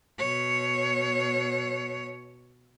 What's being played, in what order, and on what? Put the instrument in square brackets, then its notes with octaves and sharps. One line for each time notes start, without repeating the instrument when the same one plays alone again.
[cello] B2 C#5